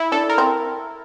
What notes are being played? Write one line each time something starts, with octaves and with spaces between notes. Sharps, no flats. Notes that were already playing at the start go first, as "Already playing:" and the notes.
Already playing: E4
D4 A4
A#4
C4